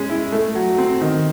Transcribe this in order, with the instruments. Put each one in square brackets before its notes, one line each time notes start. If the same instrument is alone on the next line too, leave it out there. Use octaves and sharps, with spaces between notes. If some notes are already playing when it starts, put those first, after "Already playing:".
Already playing: [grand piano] G#3 C#4
E4
A3
F#3
C4
D#3